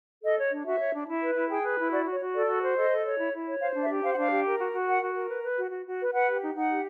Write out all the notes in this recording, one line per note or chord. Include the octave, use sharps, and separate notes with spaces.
A4 D#5
C#5
D4
F#4 E5
C#5
D4
E4
B4
E4
G#4 G5
B4
E4
F#4 D5
F#4
C#5
F#4
A4 D5
F#4
C5
A4 D#5
A4
C#5
E4
E4
C#5
C5 F5
D4
E5
G4
C5 F5
F#5
D4 F5
G4
A#4
F#4
F#4
A#4 F#5
F#4
A#4
B4
B4
F#4
F#4
F#4
B4
B4 F#5
G4
D#4
D#4 F#5
G4